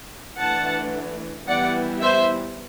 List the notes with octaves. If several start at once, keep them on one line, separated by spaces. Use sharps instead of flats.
E3 A3 D4 F#5 A5
E3 G3 B3 E4 D5 F#5
C5 E5